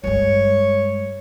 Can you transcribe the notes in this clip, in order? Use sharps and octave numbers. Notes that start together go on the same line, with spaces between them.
G2 G#3 C#5